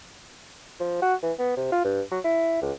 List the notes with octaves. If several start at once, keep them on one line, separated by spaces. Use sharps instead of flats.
F3
F#4
E3
B3
C3
F4
G2
F#3
E4
C#2